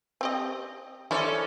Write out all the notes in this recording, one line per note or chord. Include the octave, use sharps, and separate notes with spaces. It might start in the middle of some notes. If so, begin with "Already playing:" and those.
C4 G4 D#5
C#4 E4 A4 C5 D5